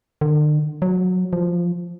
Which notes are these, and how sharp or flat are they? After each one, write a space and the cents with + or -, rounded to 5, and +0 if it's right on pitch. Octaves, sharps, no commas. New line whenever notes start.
D3 +40
F#3 -15
F3 -5